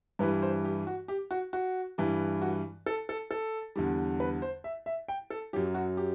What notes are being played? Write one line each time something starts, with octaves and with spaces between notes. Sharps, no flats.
G2 E3 G3 B4
C5
G4
F#4
G4
F#4
F#4
G2 E3 G3
F#4
A4
A4
A4
E2 D3 G3
B4
C5
E5
E5
G5
A4
F#2 F#3 G4
F#4
G4